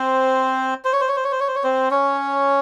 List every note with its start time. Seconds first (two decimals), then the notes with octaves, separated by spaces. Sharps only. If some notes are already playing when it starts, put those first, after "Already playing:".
Already playing: C4 C5
0.85 C5
0.93 C#5
1.01 C5
1.08 C#5
1.16 C5
1.24 C#5
1.32 C5
1.40 C#5
1.48 C5
1.56 C#5
1.64 C4 C5
1.91 C#4 C#5